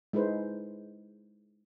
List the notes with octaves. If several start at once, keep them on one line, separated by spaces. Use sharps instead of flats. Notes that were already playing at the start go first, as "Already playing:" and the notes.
G#3 D#4 E4 B4 C5